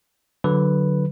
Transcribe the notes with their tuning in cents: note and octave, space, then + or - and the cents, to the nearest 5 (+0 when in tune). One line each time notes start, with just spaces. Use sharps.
D3 +0 F#3 +0 B4 +0